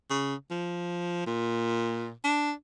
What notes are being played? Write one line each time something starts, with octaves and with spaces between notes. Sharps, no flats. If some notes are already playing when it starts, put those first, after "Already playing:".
C#3
F3
A#2
D4